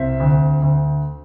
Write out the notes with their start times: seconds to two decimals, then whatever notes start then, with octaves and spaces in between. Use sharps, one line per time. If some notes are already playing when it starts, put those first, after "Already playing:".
Already playing: C2 C4 E5
0.20 D2
0.62 D2